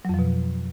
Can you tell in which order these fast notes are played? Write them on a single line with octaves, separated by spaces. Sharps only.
F#3 F2 F3 B2